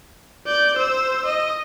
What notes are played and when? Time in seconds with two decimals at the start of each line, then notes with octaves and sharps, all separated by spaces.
0.47 D5 G6
0.77 C5 E6
1.26 D#5